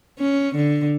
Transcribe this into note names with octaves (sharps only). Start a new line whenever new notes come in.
C#4
D3